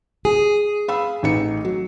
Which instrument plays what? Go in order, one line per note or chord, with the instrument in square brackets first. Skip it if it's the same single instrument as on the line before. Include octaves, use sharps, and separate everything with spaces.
[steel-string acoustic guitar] G#4
[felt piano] F5 B5 E6
A1 D#4 C#7
F#3